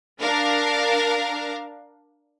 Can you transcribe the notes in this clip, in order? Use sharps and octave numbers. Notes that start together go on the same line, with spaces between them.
D4 A#4 F5